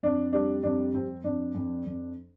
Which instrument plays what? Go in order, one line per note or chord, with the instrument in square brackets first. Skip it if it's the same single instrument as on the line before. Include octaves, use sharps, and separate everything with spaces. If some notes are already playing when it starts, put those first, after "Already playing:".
[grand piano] F2 [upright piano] D4
[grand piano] G3 [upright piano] D4
[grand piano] F2 [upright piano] D4
[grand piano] F2 [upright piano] C4
[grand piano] F2 [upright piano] D4
[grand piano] F2
F2